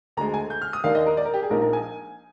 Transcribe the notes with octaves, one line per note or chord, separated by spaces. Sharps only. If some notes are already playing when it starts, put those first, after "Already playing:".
D2 D3 G#3 A#5
G#5
G6
F6
D#6
D#2 D#3 A#3 D4 F5
D#5
A#4
D5
A#4
G4
G#4
A#1 A#2 F3 A#3 D#4 A#4
A#4
G#5